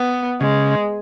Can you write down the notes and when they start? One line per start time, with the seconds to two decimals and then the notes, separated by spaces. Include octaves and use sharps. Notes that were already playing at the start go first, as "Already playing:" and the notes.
Already playing: B3
0.41 C#3 G#3